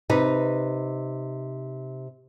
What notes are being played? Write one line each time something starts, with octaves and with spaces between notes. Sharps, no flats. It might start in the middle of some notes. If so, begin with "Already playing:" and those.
C3 D#4 B4